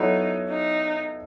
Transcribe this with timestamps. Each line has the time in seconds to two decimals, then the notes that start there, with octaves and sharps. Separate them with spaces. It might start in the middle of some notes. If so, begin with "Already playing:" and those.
Already playing: F#3 B3 D#4 E4 A4 C#5
0.49 D#4